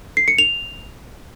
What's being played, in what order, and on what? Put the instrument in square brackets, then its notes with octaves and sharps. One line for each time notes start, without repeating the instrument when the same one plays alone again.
[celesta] C7
C#7
F7